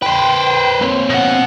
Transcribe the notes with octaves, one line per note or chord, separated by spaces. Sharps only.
B4 C5 G5
A#3 C4 C#5
B2 F#5